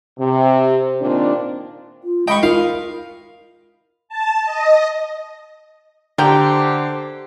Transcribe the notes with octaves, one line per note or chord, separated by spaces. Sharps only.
C3
A#2 D#3 C4 D4
F4
G#3 D#5 G5 B5 C#6 D#6
F4 A#4 F5
A5
D#5
D3 G4 A#4 C5 G5